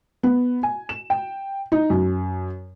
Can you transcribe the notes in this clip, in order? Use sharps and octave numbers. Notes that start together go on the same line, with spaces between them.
B3
G#5
E7
G5
D#4
F#2